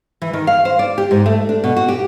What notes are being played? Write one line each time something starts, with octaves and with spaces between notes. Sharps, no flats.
E3
D#3
F5
C5
D5
G4
G#2
A3
D4
B2
F#4
G4